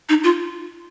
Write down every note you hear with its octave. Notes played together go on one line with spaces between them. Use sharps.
D#4
F4